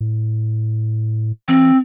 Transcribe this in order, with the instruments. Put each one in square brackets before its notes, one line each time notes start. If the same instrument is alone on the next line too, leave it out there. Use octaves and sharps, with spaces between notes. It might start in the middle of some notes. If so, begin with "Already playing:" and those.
[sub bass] A2
[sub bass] E3 [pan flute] C4